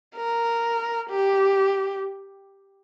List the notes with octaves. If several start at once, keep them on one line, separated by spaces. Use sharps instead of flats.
A#4
G4